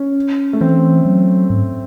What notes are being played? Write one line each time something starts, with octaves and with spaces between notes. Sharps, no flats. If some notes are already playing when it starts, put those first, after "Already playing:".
Already playing: C#4
A3
E3 C4
F#3
G#2